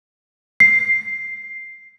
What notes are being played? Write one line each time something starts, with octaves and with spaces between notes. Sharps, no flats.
C7